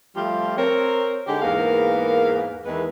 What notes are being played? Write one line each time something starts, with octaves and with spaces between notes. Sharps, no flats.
F3 G3 A3 F4 G4
C4 A#4 C#5
D3 G#3 D#4 G4
E2 G#2 A#3 B3 A#4 F5
E2 D#3 E3 G#3 B4